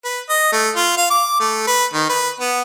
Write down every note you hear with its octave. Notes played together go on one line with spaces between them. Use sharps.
B4
D#5
A3
F4
F5
D6
A3
B4
D#3
B4
B3